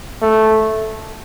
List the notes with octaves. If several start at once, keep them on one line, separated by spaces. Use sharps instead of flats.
A3